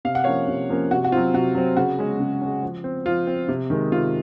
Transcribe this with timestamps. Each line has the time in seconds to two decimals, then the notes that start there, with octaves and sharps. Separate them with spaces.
0.05 C3 F5
0.15 F#5
0.24 F3 A#3 C#4 C#5 F5
0.48 C3
0.69 F3 A#3 C#4
0.91 C3 F#4
1.05 F#4
1.12 C4 F4
1.17 F#3
1.34 C3 F#4
1.55 F#3 C4
1.77 C#3 F#4
1.99 G#3 C#4
2.20 C#3
2.41 G#3 C#4
2.62 F3
2.84 C4
3.06 F3 F4
3.27 C4
3.48 C3
3.70 D#3 G#3
3.92 C3 F4